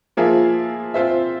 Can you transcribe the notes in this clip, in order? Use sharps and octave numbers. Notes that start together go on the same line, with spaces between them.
F3 A#3 F4 G#4 E5
C4 F4 C5 E5